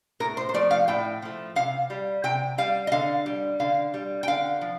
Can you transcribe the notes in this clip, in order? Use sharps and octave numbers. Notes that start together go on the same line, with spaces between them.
A2 A#4
C5
C5
F3 A3 D5
F5
A2 G5
F3 A3
C3 F5
G3
C3 G5
G3 F5
D#5
D3 F5
G3
D3 F5
G3
G5
D3 F5
F3